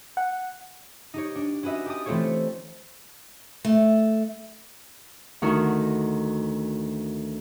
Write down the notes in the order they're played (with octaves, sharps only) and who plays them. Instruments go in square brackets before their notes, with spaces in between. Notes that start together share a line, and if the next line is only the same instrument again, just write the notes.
[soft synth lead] F#5
[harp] D#4 G4 C#5
D4
C#4 F#4 B4 D#5 E5
G4 A5 D#6
E3 A3 C4 F4 A4 C#5
[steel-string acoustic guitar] A3
[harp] D2 D#3 D4 D#4 F#4 A#4